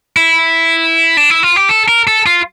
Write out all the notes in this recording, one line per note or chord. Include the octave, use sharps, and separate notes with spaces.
E4
D4
E4
F4
G4
A4
A#4
A4
F4